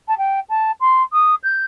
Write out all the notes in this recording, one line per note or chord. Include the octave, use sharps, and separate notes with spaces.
A5
G5
A5
C6
D#6
G6